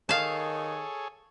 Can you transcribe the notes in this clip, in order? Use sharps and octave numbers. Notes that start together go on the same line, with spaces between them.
D#3 G#4 A4 C#5 F5 A5